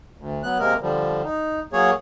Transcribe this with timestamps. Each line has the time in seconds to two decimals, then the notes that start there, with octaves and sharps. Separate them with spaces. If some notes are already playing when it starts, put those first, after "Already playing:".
0.18 D2
0.43 F#3 B3 F#6
0.59 C3 G#3 A#3 A#4
0.81 D3 F3 G3
1.24 D#4
1.73 F#3 A#3 G#4 C#5